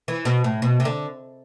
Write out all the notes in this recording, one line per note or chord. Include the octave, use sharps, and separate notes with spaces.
E3
B2
A2
B2
C3
D3